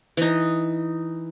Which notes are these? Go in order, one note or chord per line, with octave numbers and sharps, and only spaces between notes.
E3 D#4